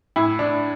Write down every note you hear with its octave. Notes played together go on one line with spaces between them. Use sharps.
A2 E4
D4